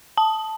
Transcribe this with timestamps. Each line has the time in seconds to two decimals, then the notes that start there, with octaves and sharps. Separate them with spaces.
0.17 A5